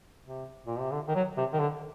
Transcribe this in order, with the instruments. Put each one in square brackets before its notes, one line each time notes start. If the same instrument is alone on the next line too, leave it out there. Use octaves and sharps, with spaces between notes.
[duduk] C3
A#2
C3
D3
D#3
F#3
C3
D#3
D3